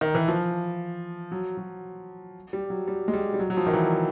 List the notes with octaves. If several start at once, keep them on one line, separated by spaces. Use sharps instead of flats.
D#3
E3
F3
F#3
F#3
G3
F#3
G3
G#3
G3
G3
F#3
F#3
F3
D#3
E3